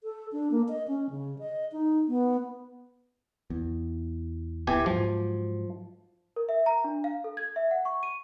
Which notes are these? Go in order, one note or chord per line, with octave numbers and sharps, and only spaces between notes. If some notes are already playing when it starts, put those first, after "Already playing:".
A4
D4
A#3
D#5
C#4
C#3
D#5
D#4
B3
E2
D1 E3 B3 G4 G#5
G#2 F3 F#3
A#4
E5
A#5
D4
F5
A4
G#6
E5
F#5
C#6
D#7